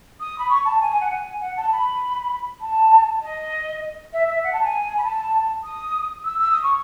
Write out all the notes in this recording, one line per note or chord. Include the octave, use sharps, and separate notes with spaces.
D#6
B5
C#6
A5
G#5
G#5
F#5
G#5
F#5
A5
B5
A5
D#5
E5
E5
F#5
A5
G#5
B5
A5
D#6
E6
E6
D#6
C#6